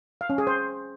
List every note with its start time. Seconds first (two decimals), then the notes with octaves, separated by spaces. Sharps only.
0.21 F5
0.30 C#4
0.38 G#4
0.47 C5